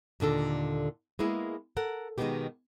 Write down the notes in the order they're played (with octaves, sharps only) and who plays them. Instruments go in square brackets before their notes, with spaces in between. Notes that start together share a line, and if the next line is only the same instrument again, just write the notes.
[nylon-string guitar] D#2 A#2 D3 A4
G#3 A#3 B3 E4 G#4
A4 A#4 F#5
B2 D#3 F#3 G#3 B3 G4